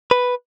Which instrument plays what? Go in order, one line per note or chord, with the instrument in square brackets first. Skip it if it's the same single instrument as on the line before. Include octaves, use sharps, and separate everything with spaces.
[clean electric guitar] B4